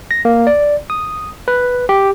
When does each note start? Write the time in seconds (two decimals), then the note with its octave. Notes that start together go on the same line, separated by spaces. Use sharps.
0.11 A#6
0.25 A#3
0.47 D5
0.90 D#6
1.48 B4
1.89 G4